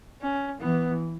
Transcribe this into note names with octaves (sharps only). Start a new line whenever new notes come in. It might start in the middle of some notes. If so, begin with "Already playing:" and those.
C#4
E3 B3